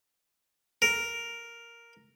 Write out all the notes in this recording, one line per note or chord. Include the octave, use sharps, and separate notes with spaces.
A#4